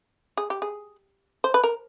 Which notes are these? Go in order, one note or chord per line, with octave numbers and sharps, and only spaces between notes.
G#4
G4
G#4
C5
B4
A#4